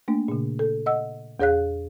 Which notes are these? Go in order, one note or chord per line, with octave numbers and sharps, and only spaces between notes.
A3 A#3 D4
A#2 C#3
A4
D#5 F#5 E6
E2 G#4 C#5 F5 F#6